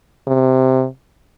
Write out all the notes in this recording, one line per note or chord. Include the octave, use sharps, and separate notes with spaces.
C3